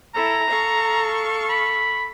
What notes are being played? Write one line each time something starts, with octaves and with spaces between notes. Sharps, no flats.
E4 A4 A#5
A4 F5 C#6
B5